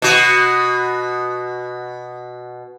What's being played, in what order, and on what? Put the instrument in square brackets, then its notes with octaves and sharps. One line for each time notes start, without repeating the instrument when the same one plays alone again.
[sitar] B2 F#4